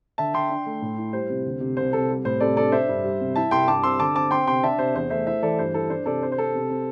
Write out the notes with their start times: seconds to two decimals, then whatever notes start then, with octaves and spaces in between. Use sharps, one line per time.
0.18 D3 E5 A5
0.34 D3 G5 C6
0.50 D4
0.66 A3
0.82 A2
0.98 E4
1.13 G3 C5
1.29 C3
1.45 D2
1.61 C3
1.77 C2 C5
1.93 C3 A4
2.09 G3
2.25 A2 C5
2.40 C3 A4 D5
2.57 D4 A4 D5
2.72 D4 C5 E5
2.89 G2
3.04 G3
3.21 C3
3.36 E4 E5 A5
3.51 C2 G5 C6
3.68 G2 A5 D6
3.83 C4 C6 E6
4.00 D3 A5 D6
4.15 C4 A5 D6
4.31 C4 G5 C6
4.47 C3 G5 C6
4.63 D4 E5 A5
4.79 C3 C5
4.94 E2 C5
5.10 A3 C5 E5
5.26 E4 C5 E5
5.42 E3 A4 D5
5.58 G2 C5
5.74 E4 A4
5.90 D4 C5
6.06 C3 A4 D5
6.21 C4 C5
6.32 C5
6.38 C4 A4
6.54 C3
6.70 C4